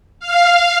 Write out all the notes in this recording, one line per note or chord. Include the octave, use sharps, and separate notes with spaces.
F5